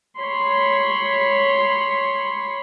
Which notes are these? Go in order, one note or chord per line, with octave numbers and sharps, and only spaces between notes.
C#5 B5 C6